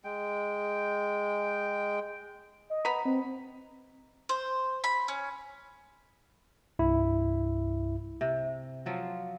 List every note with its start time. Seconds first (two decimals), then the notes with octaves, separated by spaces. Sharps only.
0.04 G#3 G5
2.70 D#5
2.85 B3 A#5 B5
3.05 C4
4.29 C5
4.84 B5
5.08 C#4
6.79 C2 G2 E4
8.21 C3
8.86 F3 F#3 F4